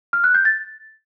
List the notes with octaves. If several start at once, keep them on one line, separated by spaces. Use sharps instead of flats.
F6
F#6
G6
A6